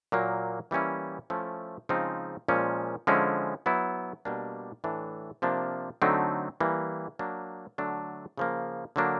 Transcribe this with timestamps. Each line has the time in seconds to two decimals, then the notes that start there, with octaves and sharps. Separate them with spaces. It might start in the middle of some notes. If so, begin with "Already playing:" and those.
0.12 A#2 F#3 A#3
0.71 E3 G3 A#3 C#4 E4
1.30 F3 A3 C#4 E4
1.89 C#3 F3 G#3 C4 D#4
2.48 A#2 F3 G#3 C#4
3.07 D3 F3 G#3 C#4 E4
3.66 F#3 B3 E4
4.25 B2 G3 A#3 D4
4.84 A2 E3 A3 D4
5.42 C3 F3 A#3 D4
6.02 D3 F#3 A3 C4 D#4
6.60 E3 G3 A#3
7.19 F#3 A#3 D4
7.78 D3 F#3 A3 D4
8.37 C#3 F3 A#3
8.96 D3 F#3 A#3 D4